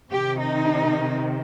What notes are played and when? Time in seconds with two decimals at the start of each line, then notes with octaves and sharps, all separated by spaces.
0.11 C3 D#3 G4
0.39 D#4